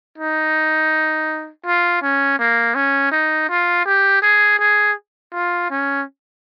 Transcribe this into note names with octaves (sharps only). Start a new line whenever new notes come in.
D#4
F4
C#4
A#3
C#4
D#4
F4
G4
G#4
G#4
F4
C#4